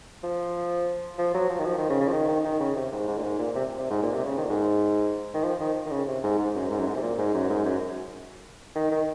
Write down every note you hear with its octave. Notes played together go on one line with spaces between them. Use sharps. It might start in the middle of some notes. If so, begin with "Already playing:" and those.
F3
F3
F#3
F3
D#3
F3
D#3
C#3
C#3
F3
D#3
D#3
D#3
C#3
C3
G#2
G#2
A#2
G#2
A#2
C3
C3
G#2
A#2
C3
C#3
D#3
A#2
G#2
D#3
F3
D#3
D#3
C#3
C3
G#2
G#2
F#2
G#2
F#2
G#2
C3
A#2
G#2
F#2
G#2
F#2
D#3
D#3